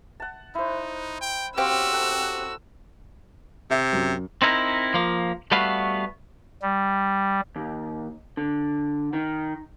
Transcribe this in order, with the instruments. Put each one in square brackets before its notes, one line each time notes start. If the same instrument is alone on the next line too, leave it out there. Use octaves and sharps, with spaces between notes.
[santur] F#5 A5
[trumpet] D#4 [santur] E4 C5
[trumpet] G5
[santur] C4 [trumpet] F#4 [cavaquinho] G4 C5 F5 [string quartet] E6
[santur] A4 F#5
[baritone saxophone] C3 [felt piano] E5
[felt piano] F#2
[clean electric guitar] C4 D#4 E4 A#4
F3 A#3
G3 A3 B3 F#4 B4 F5
[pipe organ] G3
[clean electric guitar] D#2
D3
D#3